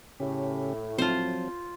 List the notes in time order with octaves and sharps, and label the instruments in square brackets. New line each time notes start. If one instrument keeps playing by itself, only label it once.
[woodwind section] A2 [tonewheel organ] C#3 C#4 G4
[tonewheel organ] F3 F#3 [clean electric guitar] C4 A5 [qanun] F4 C5